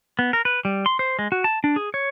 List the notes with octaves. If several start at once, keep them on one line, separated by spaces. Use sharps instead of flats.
B3
A#4
B4
G3
C6
C5
G#3
F#4
A5
D4
G#4
C#5